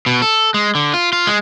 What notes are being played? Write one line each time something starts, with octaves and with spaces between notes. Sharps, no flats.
B2
A4
G#3
D3
F4
F4
G#3